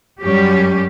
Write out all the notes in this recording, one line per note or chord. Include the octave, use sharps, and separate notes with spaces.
F#2 G3 C#4 G4